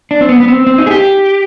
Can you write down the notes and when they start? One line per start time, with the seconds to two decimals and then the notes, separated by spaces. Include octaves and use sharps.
0.11 D4
0.21 C4
0.29 B3
0.40 B3
0.48 C4
0.67 C4
0.78 D#4
0.86 G#4
0.91 G4